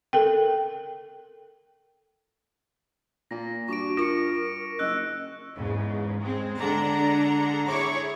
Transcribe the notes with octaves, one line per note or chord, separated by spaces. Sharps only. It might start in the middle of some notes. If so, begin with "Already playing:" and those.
A4 A#4 G5
A#2 A#6
G2 F#4 C#6 D6 D7
F4 A#4 C#6 A#6 C#7
F#1 D#5 E6 F#6
E2 G#2 C#3
G#3 C4
D3 G#3 D4 F#5 A#5
E4 G#4 C#5 C#6 D6